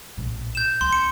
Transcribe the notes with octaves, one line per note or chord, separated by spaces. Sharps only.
A#1 A2
G6 E7
D2 C#4 C6
C#7